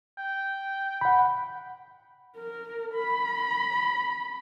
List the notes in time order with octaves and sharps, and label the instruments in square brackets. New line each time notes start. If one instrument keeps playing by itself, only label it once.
[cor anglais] G5
[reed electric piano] F#5 B5
[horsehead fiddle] A#4
B5